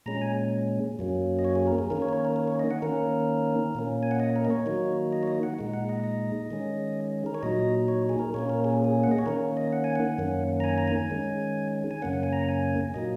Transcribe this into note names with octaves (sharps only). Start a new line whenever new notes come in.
A#2 G#3 C#4 A#5
G#5
F#2 F#3 A#3 C#4
D#5
C#5
G#4
A#4
G#4
D#3 A#3 C#4 A#4
C#5
A#4
C#5
A#4
A#4
C#5
D#5
F#5
D#3 A#3 C#4 A#4
A#2 A#3 C#4
G#5
F#5
D#5
A#4
D#5
C#5
D#3 F#3 A#3 D#4
D#5
C#5
D#5
F#5
A#2 G#3 D#4
F#5
D#5
D#5
D#3 G#3 C#4
A#4
C#5
A#2 F#3 D#4 D#5
C#5
G#4
A#4
A#2 A#3 C#4 C#5
A#4
G#4
G#4
F#5
D#5
C#5
D#3 A#3 C#4 A#4
D#5
F#5
G#5
F#5
F#2 D#3 A#3 C#4
A#5
G#5
A#5
G#5
D#3 G#3 C#4
G#5
F#2 C#3 A#3 C#4 F#5
F#5
G#5
A#5
G#5
A#2 F#3 A#3 D#4 D#5